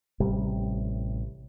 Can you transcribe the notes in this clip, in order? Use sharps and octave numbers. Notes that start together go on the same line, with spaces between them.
A1 C3 G3